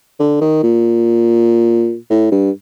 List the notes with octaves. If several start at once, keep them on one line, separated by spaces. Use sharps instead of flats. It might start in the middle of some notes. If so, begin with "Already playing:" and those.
D3
D#3
A#2
A2
G2